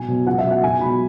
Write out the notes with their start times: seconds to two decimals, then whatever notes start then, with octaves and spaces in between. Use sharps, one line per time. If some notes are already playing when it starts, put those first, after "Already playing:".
Already playing: B1 G#5
0.08 B2 F#3
0.27 C#2 F#5
0.38 E5
0.45 B2 F#3
0.51 F#5
0.63 B1 G#5
0.81 B2 F#3 B5